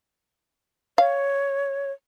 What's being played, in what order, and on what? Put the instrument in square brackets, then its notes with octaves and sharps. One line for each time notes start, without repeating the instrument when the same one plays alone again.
[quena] C#5 [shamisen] F5